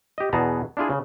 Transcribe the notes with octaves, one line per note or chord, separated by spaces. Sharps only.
G4 D#5
E2 B2 B3 G#4 A5 A#5
D4 E4 F4 G#4
C#3